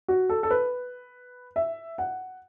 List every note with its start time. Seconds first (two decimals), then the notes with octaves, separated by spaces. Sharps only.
0.08 F#4
0.29 A4
0.43 A4
0.51 B4
1.56 E5
1.98 F#5